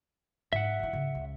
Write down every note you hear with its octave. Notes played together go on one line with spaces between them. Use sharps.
G#2 E5 F#5
D#3 E4
C#3
C#2